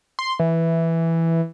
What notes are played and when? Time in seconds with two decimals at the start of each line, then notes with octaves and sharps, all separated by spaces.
0.19 C6
0.39 E3